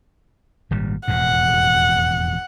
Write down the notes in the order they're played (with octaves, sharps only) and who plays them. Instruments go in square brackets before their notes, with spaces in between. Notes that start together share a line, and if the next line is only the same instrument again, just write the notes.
[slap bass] G#1 A#2 G3
[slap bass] E1 F2 A2 [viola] F#5